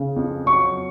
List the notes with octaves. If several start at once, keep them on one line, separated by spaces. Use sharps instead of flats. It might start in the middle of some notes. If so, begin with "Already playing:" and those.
Already playing: C#3
F2
F#3 C#6